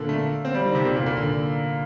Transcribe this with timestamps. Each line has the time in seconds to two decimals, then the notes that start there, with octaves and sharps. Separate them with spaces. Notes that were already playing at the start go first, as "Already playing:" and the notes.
Already playing: A#2 D3
0.09 A3
0.45 C4
0.55 G3
0.66 D#3
0.75 C3
0.85 A#2
0.96 A#2
1.06 A#2
1.17 D3